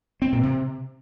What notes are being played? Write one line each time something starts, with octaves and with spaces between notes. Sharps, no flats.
C4
A#2
C3